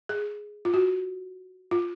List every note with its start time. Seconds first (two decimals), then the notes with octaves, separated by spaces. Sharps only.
0.09 G#4
0.65 F4
0.74 F#4
1.71 F4